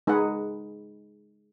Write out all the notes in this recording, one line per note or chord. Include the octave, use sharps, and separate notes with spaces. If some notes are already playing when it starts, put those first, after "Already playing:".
G#3 D#4 G#4 B4 F#5